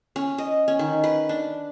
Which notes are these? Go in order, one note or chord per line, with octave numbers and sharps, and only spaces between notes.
C#4
D#5
C#4
D#3
B4
D4